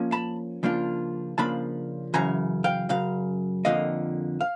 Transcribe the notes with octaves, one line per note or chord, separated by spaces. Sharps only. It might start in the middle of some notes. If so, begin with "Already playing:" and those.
Already playing: F3 A#3 C#4
A5 B5
C#3 F3 A#3 D4 F4
C#3 F3 A#3 D4 F4 A5 B5
F#2 C#3 E3 G#5 A#5
F5 G5
F#2 C#3 F5
F2 D3 F3 A#3 D#5 F5
F5